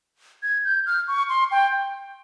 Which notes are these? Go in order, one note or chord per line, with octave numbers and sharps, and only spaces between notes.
G#6
G6
F6
C#6
C6
G5